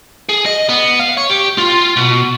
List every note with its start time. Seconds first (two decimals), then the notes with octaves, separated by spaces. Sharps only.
0.29 G#4
0.46 D#5
0.69 B3
1.00 F5
1.17 C#5
1.30 G4
1.58 F4
1.97 B2